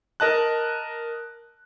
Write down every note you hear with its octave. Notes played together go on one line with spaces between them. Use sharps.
A#4 D#5 A5 F#6